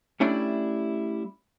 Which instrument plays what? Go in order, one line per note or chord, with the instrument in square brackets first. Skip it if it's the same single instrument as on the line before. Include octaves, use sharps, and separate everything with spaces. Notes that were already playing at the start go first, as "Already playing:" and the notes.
[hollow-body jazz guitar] G3 A3 C#4 D4 E4 D5